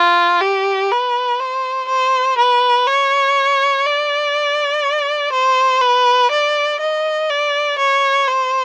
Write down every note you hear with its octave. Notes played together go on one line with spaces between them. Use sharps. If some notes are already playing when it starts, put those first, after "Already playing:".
Already playing: F4
G4
B4
C5
C5
B4
C#5
D5
C5
B4
D5
D#5
D5
C#5
C5